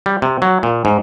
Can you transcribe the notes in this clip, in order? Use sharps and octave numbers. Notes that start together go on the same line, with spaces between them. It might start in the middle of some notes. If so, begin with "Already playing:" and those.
G3
C3
F#3
A#2
G#2